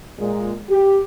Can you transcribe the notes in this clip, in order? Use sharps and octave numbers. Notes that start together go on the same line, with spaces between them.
A#2 G#3
G4